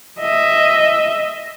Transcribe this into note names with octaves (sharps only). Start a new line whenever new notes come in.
D#5 E5